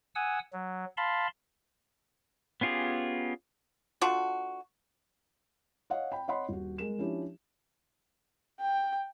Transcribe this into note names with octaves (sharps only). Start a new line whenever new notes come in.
F#5 G#5 D#6 E6
F#3
F5 A5 B5 C6
B3 C#4 F4 G4 G#4
A3 D4 F4 F#4
C#5 D#5 F5 F#5
G5 B5
C#5 D#5 F#5 B5 C6
D#1 F#4
G#3 A#4 E7
F3 C#4 D4 E4 G4
G5